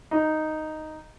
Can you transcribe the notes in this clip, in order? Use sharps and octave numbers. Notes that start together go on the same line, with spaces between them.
D#4